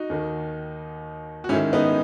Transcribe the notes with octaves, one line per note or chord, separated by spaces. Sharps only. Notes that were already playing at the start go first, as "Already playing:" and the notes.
Already playing: D#4 F#4
D#2 D#3
F#4
G#2 D#3 C#4 E4
B3 D#4